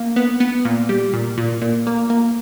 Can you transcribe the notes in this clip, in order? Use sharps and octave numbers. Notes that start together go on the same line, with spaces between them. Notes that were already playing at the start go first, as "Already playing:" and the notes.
Already playing: A#3
B3
B3
A#2
G3
A#2
A#2
A#2
A#3
A#3